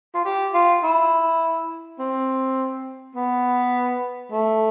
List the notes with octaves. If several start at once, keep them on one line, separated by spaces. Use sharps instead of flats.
F4
G4
F4
E4
C4
B3
A3